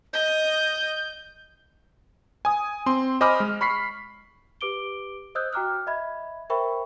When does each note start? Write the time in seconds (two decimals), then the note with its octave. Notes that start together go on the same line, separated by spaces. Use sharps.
0.13 D#5 G6
2.45 G#5 D#6
2.86 C4 C6
3.21 C5 D#5 G#5 B5 D6 F6
3.40 G#3
3.61 B5 C#6 B6 C7
4.61 G4 B4 D6 D7 G7
5.35 C5 D#5 D#6 E6 F#6 G6
5.53 F#4 G5 A#5 D6 F6 F#6
5.87 D#5 E5 B5 G#6
6.50 A#4 C5 E5 G5 B5 C#6